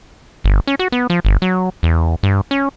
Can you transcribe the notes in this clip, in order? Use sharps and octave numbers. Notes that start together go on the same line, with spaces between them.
G1
C#4
F#4
B3
F3
G1
F#3
E2
G2
C#4